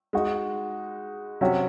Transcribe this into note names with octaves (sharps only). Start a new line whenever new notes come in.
G#3 D#4 F#4
C3 F#3 C#4 F#4